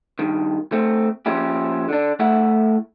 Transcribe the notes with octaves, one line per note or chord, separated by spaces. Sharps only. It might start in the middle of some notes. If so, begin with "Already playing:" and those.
G2 D#3
A3 C4
F3 A#3 C#4 E4 G4
D3 D4
A3 E4 E5 F#5